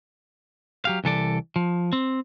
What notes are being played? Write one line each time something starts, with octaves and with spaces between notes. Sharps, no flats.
F#3 G4 F5
C2 E3 A4 D5
F3
C4